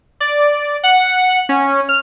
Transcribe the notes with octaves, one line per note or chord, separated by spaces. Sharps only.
D5
F#5
C#4
F6